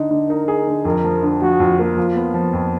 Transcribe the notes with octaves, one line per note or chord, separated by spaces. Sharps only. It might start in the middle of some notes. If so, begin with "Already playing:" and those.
Already playing: D3 D#4
D3
D#4 A#4
G#4
D3
F2 A#4
F3
D3
F3 F#4
F2
A#3
F3 F4
B3
F3
F2